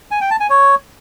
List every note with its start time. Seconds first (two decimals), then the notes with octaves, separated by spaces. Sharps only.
0.11 G#5
0.21 G5
0.31 A5
0.40 G#5
0.50 C#5